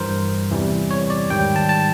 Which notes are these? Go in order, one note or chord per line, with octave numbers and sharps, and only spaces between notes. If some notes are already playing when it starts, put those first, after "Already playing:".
Already playing: G2 E3 G3 A#4 C5
E2 C3 E3 G3
C#5
D5
G#2 D#3 G3 G5
A5
A5